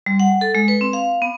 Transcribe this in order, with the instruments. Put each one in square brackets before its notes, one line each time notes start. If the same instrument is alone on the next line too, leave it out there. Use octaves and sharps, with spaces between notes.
[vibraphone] G3
F#5
A4
G#3
B4
C4
F5
B3